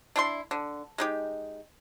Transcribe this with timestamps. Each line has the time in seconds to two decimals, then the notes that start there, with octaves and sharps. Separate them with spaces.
0.16 D4 E4 G5 C6
0.51 D3
0.98 G#3 D#4 G4